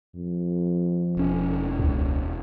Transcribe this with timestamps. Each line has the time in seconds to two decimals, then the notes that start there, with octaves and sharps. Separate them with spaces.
0.16 F2
1.17 E1 C#4
1.79 C#2